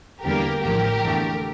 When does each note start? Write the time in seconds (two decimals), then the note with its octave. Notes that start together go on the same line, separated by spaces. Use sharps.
0.24 E2 D3 G3 A#3 G4 A#4
0.63 A1 A2 F3 A#3 G4 A#4
1.03 E2 D3 A3